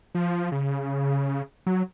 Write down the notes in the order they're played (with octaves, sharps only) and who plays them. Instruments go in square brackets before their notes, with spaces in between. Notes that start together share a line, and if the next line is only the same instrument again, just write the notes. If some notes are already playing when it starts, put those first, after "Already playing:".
[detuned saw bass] F3
C#3
F#3